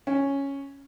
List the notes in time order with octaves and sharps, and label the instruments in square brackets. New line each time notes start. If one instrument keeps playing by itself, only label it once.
[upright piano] C#4